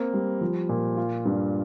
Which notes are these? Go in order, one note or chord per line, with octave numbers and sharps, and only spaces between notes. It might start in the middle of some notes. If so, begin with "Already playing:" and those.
Already playing: A#3 C4
G3
F3
A#2
F4
G2